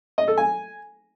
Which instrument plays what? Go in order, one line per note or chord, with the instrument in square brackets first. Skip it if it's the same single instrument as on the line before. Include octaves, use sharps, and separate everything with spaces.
[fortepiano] D#5
A4
G#5